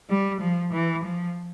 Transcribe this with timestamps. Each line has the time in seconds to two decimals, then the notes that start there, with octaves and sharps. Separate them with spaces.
0.10 G3
0.41 F3
0.73 E3
1.04 F3